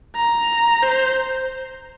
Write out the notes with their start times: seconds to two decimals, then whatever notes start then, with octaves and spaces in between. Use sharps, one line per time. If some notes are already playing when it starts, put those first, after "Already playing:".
0.16 A#5
0.82 C5